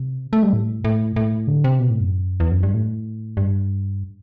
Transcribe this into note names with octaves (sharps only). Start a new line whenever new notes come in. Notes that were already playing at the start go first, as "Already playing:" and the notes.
Already playing: C3
A3
G3
A2
A2
A2
D3
C3
B2
A2
F#2
E2
F#2
G2
A2
G2